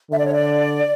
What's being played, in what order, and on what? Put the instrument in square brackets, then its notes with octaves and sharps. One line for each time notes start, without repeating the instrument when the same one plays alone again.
[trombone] D3 [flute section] E5
[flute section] D5
C#5
D5